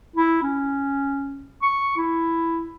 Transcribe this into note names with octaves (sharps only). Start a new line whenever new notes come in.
E4
C#4
C#6
E4